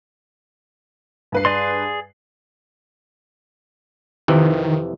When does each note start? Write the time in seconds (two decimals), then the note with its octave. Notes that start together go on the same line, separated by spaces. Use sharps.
1.32 G2 B4 C7
1.45 G#4 D5 C6
4.28 F2 C3 D#3 E3